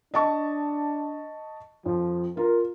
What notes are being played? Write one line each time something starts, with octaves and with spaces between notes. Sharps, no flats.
D4 D#5 A5 C#6
F2 F3
F4 A#4